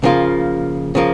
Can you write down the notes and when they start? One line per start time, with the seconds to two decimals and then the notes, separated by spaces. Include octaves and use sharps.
0.03 C#3 F3 A#3 F4
0.95 C#3 F3 A#3